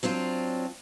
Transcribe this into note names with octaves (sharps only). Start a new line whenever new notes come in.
F#3 C4 D4 F4